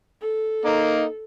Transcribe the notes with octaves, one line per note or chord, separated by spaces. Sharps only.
A4
A#3 D#4